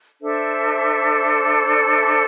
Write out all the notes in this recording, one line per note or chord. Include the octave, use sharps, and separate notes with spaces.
D4 A4 C5 E5
D5
D5
E5